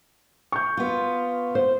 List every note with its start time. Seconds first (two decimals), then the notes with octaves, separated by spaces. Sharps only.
0.52 C#6 G6
0.77 B3 F4
1.55 C5